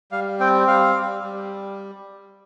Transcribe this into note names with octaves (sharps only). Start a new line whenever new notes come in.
G3 F5
C4 G5
G3 F5
G3
G3